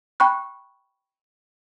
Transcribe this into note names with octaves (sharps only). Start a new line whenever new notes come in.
G5 B5 C#6 F#6